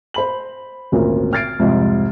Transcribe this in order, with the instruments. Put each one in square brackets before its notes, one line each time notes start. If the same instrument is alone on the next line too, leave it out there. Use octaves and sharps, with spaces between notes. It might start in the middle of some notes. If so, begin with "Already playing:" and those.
[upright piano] C5 B5 F#7
G#1 D2 A#2 C#4 A#4
F6 G#6 A6 C7 D7
C2 F2 G#2